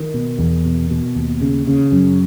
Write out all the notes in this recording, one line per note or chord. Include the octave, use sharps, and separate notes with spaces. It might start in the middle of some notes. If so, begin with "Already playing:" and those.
Already playing: D#3
B2
E2
B2
B2
D#2
C#3
C#3
F#2